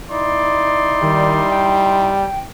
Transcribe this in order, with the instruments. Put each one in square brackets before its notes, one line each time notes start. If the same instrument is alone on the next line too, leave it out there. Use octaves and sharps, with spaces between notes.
[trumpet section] D#4 E4 C6 [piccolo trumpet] D5
[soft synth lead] D#3 [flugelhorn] G3
[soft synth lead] G5